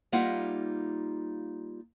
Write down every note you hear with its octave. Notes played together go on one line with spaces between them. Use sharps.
G3 A#3 D#4 F4 E5 F#5